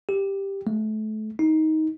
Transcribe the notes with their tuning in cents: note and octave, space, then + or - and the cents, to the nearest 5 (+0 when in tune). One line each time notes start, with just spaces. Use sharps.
G4 +5
A3 -30
D#4 +15